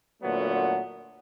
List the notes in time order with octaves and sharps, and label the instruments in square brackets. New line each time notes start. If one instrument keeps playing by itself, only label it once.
[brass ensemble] A#2 D3 F#3 A3 B3